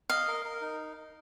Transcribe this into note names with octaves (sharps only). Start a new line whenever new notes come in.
D#5 F5
A#4
A#4
D#4